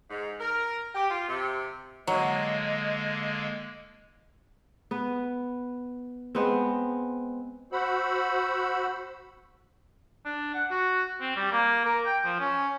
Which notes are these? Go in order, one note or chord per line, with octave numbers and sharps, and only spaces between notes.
G#2
A#4
G4
F4
C3
D3 F#3 G#3 A#3 D#5
B3 B4
G#3 B3 C4
F#4 C5 F#5 B5 E6
D4
F#5
F#4
C4
G3
A#3
A#4
G5
F3
C#4